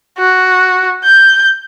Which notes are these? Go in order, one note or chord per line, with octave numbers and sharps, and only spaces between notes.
F#4
G6